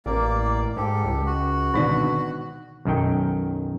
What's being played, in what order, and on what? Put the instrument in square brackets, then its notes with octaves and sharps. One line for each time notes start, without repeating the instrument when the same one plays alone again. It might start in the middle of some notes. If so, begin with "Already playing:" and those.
[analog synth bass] A1 [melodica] A#3 D5 [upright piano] A#4
[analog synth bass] G#2 [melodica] G4 A4
[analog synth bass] C#2
[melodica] F#4
[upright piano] G#1 B2 B3 [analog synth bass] D3 [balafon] D#3 D#4 D5
[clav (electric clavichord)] B1 F#2 D#3 G5